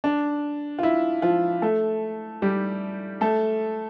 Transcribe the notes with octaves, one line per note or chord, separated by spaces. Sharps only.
D4
F4
E4
F3 F4
A3 A4
G3 G4
A3 A4